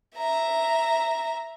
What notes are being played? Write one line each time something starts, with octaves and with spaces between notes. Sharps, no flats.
E5 A#5